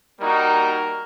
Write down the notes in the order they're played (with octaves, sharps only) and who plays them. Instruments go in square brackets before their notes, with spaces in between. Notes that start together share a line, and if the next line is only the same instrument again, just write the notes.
[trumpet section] G3 A#3 D#4 F#4 A#4